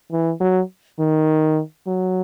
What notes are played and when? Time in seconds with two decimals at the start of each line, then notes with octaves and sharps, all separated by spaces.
0.12 E3
0.40 F#3
0.99 D#3
1.87 F#3